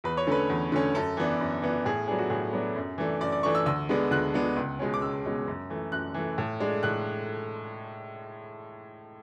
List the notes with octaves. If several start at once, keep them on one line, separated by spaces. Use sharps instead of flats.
E2 B4
C#5
D3 A3 C#4 B4
E2
D3 A3 C#4
F#2 A4
E3 B3 D4
F#2
E3 B3 D4
A2 G#4
F#3 B3 D4 G#4
F#4
A2 G#4
F#3 B3 D4
F#2
E3 A3 D4
F#2 D5
D5
E3 A3 D4 C#6
E6
D2 E6
D3 G#3 B3 D4
D2 F#6
D3 G#3 B3 D4
C#2
B2 G#3 C#4
D6
C#2 E6
B2 G#3 C#4
F#2
E3 A3
F#2 F#6
E3 A3
A2
G#3 D4
A2 F#6